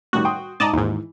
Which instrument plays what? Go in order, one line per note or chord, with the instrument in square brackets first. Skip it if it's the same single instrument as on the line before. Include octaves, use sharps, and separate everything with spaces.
[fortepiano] A2 D#3 G3 [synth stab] F#4
[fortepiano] G5 C6 D#6
[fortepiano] G#2 A#5 [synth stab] D5 D#5 A5
[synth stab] D#2 G#2 [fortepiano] E3